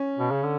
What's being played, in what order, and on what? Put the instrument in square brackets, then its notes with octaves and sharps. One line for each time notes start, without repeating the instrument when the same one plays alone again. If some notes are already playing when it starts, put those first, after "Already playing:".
Already playing: [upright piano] C#4
[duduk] B2
C#3
D3